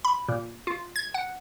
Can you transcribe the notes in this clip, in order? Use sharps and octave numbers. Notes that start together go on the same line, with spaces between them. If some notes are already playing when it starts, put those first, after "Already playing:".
B5
A#2
F4
G#6
F#5